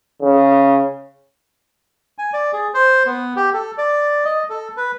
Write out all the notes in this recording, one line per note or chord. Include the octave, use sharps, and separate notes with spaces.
C#3
G#5
D5
G#4
C5
B3
G4
A4
D5
D#5
A4
B4